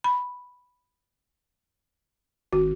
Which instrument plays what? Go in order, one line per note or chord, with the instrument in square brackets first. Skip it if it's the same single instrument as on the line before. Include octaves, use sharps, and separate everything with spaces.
[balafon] B5
[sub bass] G#1 [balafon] F#4